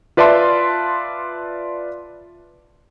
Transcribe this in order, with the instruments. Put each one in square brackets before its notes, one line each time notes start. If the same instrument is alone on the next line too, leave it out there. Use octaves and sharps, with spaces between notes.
[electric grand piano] F4 B4 D5 E5 A5 C6